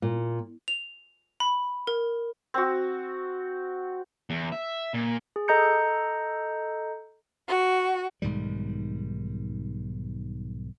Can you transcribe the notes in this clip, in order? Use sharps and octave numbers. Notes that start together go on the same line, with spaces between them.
A#2
F7
B5
A#4
C4 F#4
E2
E5
A#2
G#4
A4 D#5 A#5 G6 C#7
F#4
B1 G#2 D#3 G3